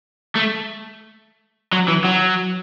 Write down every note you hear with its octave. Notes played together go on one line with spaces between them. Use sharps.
A3
F#3
E3
F#3